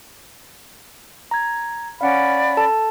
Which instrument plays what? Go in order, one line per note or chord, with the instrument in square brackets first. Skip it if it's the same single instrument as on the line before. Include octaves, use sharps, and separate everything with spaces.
[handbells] A#5 G#6
[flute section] C#4 D5 B5 [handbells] F5 F#5
[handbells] A4 A5